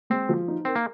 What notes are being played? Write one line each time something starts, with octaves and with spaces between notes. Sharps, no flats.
G#3 C4
F3
D#4
C4 A#4
A#3